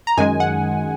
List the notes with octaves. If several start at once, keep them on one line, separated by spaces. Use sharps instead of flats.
A#5
F#2 D#3 G#3 G#5
F#5